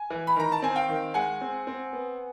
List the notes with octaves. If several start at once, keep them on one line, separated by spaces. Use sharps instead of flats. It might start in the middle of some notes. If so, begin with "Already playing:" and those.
Already playing: G#5
E3
B5
D#3 A#5
A5
C4 G#5
F5 G5
D#3
G#3 F#5 G#5
C4
C4
B3